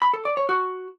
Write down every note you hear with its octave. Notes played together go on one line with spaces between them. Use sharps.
B5
A4
D5
C#5
F#4